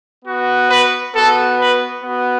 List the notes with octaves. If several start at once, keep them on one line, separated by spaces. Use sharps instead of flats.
B3 F#4
B4
B3 F#4 A4
B4
B3 F#4